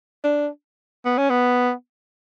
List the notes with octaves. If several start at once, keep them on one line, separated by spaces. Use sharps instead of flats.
D4
B3
C#4
B3